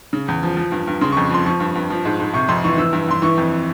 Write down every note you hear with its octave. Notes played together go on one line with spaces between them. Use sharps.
C#3
E2
F3
F3
G2
G2
C#3 C6
F2 C#6
F3 C6
F3 C#6
G2
G2
F3
G#2
G#2
C3 C#6
F2 C6
E3 C#6
E3 E6
G2
G2 C6
E3 C#6
F2